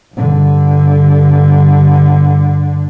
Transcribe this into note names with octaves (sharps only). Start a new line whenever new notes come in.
G2 D3